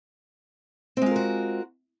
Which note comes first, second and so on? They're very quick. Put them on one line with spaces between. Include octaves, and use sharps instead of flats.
C4 G#3 F4 A#4 F#4